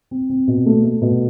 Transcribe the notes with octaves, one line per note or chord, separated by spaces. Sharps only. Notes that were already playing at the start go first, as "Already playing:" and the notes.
C4
C4
B2
A3
A3
B2